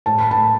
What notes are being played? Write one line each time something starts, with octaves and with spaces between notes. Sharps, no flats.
A2 A5
B5
A5